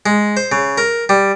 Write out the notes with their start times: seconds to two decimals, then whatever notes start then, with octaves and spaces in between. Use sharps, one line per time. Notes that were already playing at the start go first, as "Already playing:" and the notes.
0.06 G#3
0.37 C5
0.52 C#3
0.78 A#4
1.09 G3